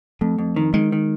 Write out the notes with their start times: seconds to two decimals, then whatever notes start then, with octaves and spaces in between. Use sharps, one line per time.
0.21 F2 A3
0.38 F2
0.56 D#3
0.74 D#3 G#3
0.92 D#3